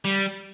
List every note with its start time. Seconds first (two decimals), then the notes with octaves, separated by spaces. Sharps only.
0.05 G3